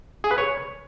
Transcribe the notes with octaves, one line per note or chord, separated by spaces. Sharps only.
G#4
B4
C#5